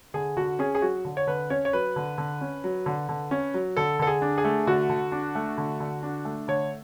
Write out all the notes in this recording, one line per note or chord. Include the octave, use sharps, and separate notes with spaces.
D3 G#4
D3 F#4
C#4 G#4
G#4
F#3 F#4
D3
C#5
D3 B4
C#4 C#5
C#5
F#3 B4
D3
D3
C#4
F#3
D3
D3
C#4
F#3
D3 A4
D3 A4
G#4
D4
G#4
A3
D3 F#4
D3
D4
A3
D3
D3
D4
A3
D3 C#5